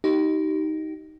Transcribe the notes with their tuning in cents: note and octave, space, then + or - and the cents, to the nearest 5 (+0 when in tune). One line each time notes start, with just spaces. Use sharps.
D#4 +10 G4 -25